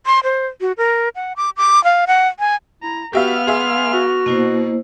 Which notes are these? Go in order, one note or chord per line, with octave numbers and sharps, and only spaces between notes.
C6
C5
F#4
A#4
F#5
D6
D6
F5
F#5
G#5
E4 A#5
B3 F#4 G4 E5 F5 F6
G#4 E5 F5 C6
F#4
B2 A#3 E4 C5